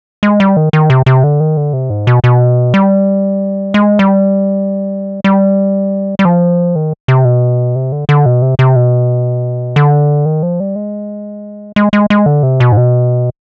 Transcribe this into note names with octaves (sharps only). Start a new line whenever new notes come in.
G#3
G3
D#3
D#3
C3
C3
D3
D#3
D3
C3
G#2
B2
B2
G3
G#3
G3
G3
G3
F3
D#3
C3
B2
C3
D3
D3
B2
C3
C3
B2
D3
D#3
F3
G3
G#3
G#3
G#3
G#3
D3
C3
B2
G#2
B2